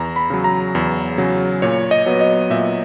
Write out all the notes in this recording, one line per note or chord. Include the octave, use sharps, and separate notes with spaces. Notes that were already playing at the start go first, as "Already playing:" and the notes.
Already playing: E2 A#5
B5
C#3 F#3
A#5
E2
C#3 F#3
A#2 C#5
D#5
F#3 B3
D#5
A#2 E5